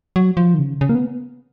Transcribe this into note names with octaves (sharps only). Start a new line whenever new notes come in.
F#3
F3
D#3
C#3
C#3
A#3
B3